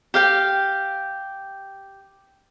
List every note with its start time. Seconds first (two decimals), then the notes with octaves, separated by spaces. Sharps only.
0.14 G4 F5 G5